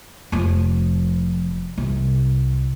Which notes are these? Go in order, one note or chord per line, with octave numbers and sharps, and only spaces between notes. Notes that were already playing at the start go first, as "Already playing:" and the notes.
F1 F3
C2